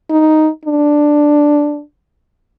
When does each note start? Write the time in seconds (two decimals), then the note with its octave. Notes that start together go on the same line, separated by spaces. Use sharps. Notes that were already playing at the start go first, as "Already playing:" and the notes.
0.10 D#4
0.66 D4